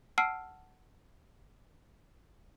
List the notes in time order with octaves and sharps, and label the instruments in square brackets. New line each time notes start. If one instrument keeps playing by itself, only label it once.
[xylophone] F#5 A5 E6 F6 C7 D7